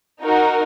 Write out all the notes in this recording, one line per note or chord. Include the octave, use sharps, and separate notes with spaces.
D#4 F#4 A#4